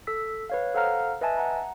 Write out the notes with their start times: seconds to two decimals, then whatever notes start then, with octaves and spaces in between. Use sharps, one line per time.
0.07 A4 E6 B6
0.50 B4 C#5 F5
0.74 A4 C5 F5 F#5 A#5 F6
1.21 B4 D#5 E5 G#5 A5
1.37 F#5 A#5